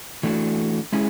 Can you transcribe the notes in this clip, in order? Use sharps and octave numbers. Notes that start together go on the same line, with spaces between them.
E3 A3 D4 F#4
G#3 C#4 E4 G#4